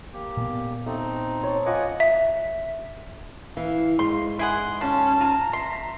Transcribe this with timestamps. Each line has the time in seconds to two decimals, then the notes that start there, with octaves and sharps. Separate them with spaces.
0.13 A#3 G4
0.37 A#2 B3
0.86 A3 C4 D#4
1.43 C#5 A5
1.66 F4 D#5 F#5 G#5 D6
2.00 E5
3.57 E3 F5
3.99 G#2 G#4 C6
4.39 E4 G#4 F#5 C6
4.81 F3 C#4 A5
5.21 F4 A#5
5.53 E5 C6